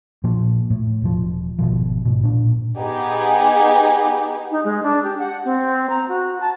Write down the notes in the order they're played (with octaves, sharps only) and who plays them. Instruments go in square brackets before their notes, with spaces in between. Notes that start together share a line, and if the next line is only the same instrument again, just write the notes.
[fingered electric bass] A#2 F3
A2
E1 F3
G#1 D2 B2 F3
G#2 B2
A#2 D4
[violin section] B3 D#4 G4 G#4
[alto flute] D#4
G#3
D4
G4
F#5
C4
A#5
F#4
A5